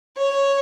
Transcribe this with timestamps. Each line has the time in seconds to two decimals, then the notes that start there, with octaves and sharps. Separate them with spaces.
0.17 C#5